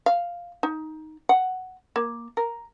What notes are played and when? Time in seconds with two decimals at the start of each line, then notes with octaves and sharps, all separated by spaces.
0.06 F5
0.63 D#4
1.29 F#5
1.96 A#3
2.37 A#4